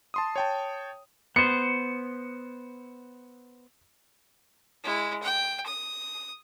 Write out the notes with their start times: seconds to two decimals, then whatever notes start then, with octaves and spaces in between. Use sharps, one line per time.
0.14 A5 C6 D#6
0.36 C#5 G5 A5
1.36 B3 C5 C#7
4.83 G#3 E4
5.23 G5
5.66 D#6